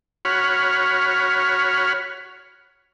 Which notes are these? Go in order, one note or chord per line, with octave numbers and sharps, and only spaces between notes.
F#4 C#5 B5 F6